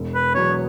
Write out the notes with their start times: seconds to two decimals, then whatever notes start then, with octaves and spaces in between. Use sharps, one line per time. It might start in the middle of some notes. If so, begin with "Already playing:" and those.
Already playing: E1
0.14 B4
0.34 E2 B2 F#3 B3 C#5